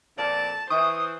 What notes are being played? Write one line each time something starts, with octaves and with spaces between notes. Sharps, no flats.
F2 A#2 D5 A5
E3 C5 C#6 D#6